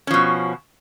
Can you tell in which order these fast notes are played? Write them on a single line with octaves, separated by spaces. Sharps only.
C#4 F3 B2